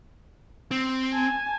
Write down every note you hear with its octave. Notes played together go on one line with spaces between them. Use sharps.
C4
G#5 A5